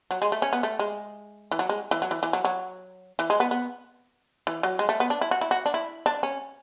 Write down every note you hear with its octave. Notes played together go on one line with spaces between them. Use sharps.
F#3
G#3
A3
C#4
B3
A3
G#3
E3
F#3
G#3
E3
F#3
E3
E3
F#3
F#3
E3
G#3
B3
B3
E3
F#3
G#3
A3
B3
D4
E4
F#4
E4
F#4
D4
E4
D4
C#4